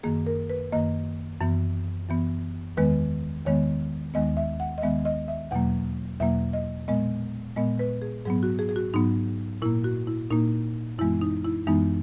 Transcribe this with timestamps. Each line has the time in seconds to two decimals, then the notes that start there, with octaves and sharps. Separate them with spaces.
0.03 F#2 D#3 A#3 G#4
0.27 A#4
0.50 B4
0.72 F#2 D#3 A#3 D#5
1.41 F#2 E3 B3
2.09 F#2 E3 B3
2.77 E2 D#3 G#3 B3 B4
3.45 E2 D#3 G#3 B3 C#5
4.14 D#2 D#3 G#3 B3 D#5
4.37 E5
4.60 F#5
4.78 D#5
4.82 D#2 D#3 G#3 B3 E5
5.05 D#5
5.28 E5
5.51 E2 B2 F#3 A#3 F#5
6.20 E2 B2 F#3 A#3 E5
6.53 D#5
6.88 A#2 G#3 B3 D#5
7.56 A#2 G#3 B3 D#5
7.79 B4
8.02 G#4
8.25 G#2 F#3 B3 G#4
8.43 F#4
8.59 G#4
8.69 G#4
8.76 F#4
8.93 G#2 F#3 B3 D#4
9.62 A#2 A#3 E4
9.84 F#4
10.07 E4
10.31 A#2 A#3 D#4
10.99 F#2 E3 G#3 B3 E4
11.21 D#4
11.45 E4
11.67 F#2 E3 G#3 B3 D#4